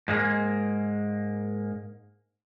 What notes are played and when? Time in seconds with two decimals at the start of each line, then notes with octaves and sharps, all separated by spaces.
0.08 G#2 G#3 A#3